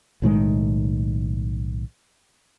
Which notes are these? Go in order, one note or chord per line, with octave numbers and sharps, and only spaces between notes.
B1 A2 D#3 G#3